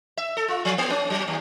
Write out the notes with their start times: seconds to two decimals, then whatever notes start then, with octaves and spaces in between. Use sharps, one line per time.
0.17 E5
0.37 A4
0.48 F4
0.65 F3
0.78 A#3
0.90 C#4
1.10 F#3
1.28 D#2